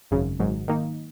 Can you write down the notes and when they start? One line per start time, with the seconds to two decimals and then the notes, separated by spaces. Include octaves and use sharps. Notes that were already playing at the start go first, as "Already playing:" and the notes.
0.11 G#1 F#2 C#3
0.40 G#1 G#2 F#3
0.68 D#3 A#3 D#4